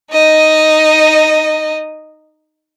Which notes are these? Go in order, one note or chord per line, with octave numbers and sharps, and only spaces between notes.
D#4 D#5